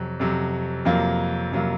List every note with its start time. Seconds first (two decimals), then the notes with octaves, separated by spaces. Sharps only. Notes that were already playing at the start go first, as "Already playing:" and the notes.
Already playing: F2 C3 F#3
0.20 F2 C3 F#3
0.85 F2 C3 F#3 A#3 F4
1.52 F2 C3 F#3 A#3 F4